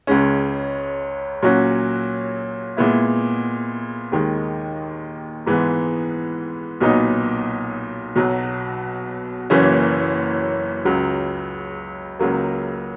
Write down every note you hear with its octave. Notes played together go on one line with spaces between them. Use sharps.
C#2 C#3 G#3 C#4
A#2 F#3 C#4 F#4
A#2 G#3 B3 E4
D#2 D#3 G#3
G#2 E3 G#3 B3
B1 A#2 F#3 B3 D#4
B1 B2 F#3
F#1 F#2 E3 A#3 C#4
C#2 C#3 F#3
C#2 C#3 F#3 A#3